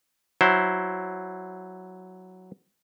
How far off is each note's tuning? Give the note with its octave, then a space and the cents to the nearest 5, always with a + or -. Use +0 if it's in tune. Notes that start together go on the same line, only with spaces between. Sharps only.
F#3 +0 E4 +0 C5 +5